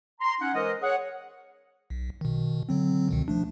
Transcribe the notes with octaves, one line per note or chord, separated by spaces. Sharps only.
A#5 C6
C#4 D#4 F#5
E3 G#3 A#4 C5 D#5
G#4 C#5 F#5
B1
B2 D#3
D3 F#3 C4
C#2 B2 D#3
F3 A3 D4